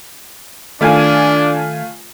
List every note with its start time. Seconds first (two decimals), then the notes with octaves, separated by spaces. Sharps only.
0.81 D#3 A3 D4 F4 G#5